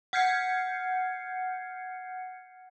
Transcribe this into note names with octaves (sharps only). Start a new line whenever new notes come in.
F#5 F6 G6 G#6 C7 C#7